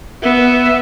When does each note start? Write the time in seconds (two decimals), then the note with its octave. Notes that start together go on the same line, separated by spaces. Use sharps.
0.22 B3 E5